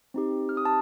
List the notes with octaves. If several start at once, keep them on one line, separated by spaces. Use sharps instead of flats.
C4 D#4 G4
F6
D#6
A5